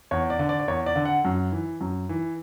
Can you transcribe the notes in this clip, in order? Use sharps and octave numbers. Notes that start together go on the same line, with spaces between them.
E2 C#5
D5
D3
D5
D5
E2 C#5
D5
D3
F#5
F#2
E3
F#2
E3